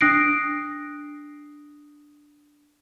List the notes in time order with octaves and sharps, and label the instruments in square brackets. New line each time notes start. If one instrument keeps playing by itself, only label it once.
[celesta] D4 D#6 F#6 A#6 C7 D7